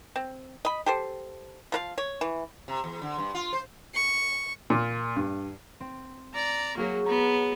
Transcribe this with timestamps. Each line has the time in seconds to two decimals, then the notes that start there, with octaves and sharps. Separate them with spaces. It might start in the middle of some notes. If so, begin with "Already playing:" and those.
0.16 C4
0.65 D#5 B5
0.86 G4 A4 C5
1.72 F3 A#4 F5
1.98 C#5
2.21 E3
2.68 C3
2.84 E2
3.02 D3
3.18 G2
3.34 F4
3.53 C5
3.94 C#6
4.70 A#2
5.16 G2
5.80 C4
6.34 D5 A#5
6.77 F#3 A#3 F#4 G#4 C#5
7.06 B3 A#5